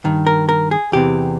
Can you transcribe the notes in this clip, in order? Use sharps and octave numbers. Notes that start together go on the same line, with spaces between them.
G2 D#3
A#4
A#4
G#4
E2 C3 E3 G4